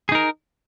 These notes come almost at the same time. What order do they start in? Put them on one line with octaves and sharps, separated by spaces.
G#4 D#4 A#4